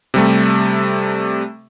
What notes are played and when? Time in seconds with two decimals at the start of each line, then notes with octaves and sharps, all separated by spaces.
0.14 C3 G3 A3